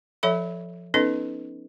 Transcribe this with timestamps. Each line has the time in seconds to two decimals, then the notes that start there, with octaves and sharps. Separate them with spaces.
0.23 F3 A4 C#5 E5 B5
0.94 B3 C#4 D#4 A4 B4 D#5